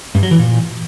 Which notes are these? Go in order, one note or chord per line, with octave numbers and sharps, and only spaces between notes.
G2
F#3
E3
A#2